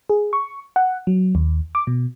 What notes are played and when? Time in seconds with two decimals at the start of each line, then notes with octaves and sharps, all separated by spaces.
0.10 G#4
0.33 C#6
0.76 F#5
1.07 F#3
1.35 D#2
1.75 D6
1.87 B2